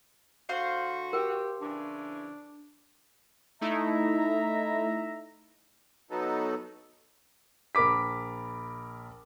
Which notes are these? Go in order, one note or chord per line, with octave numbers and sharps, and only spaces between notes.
D3 F#4 C5 F5
G4 A#4 G5
C#3 E3 D4
A3 D#4 E4 E5 A#5
F#3 B3 D#4 A4
A#1 A#4 B5 D6 B6